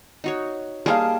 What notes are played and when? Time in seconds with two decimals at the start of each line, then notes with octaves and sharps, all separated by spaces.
0.24 D#4 F#4 C#5
0.86 D#3 G3 A#3 E4 G#4 F5 A5